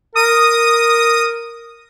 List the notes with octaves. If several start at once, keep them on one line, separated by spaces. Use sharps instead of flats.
A#4 D#6